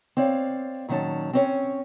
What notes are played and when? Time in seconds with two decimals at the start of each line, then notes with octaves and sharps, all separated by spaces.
0.17 C4 C#5 D5 F5
0.89 A#2 D#3 F#3 C#4 A5
1.33 C4 C#4 C#5